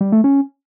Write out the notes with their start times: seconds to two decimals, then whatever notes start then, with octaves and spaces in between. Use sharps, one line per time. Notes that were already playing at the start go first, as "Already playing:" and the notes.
0.01 G3
0.12 A3
0.24 C#4